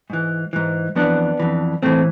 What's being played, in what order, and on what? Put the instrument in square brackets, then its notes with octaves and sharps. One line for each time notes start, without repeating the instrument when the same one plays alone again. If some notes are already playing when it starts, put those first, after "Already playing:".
[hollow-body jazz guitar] G#2 E3
G#2 E3
F2 E3 B3 D4
F2 E3
A2 E3 A3 C4